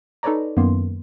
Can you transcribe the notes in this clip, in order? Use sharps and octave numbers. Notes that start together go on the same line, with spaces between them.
D#4 A4 B4 C#5 D5 A#5
F#2 D#3 A#3 B3 C6